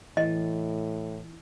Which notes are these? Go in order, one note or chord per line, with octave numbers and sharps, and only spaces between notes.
A2 E3 D#5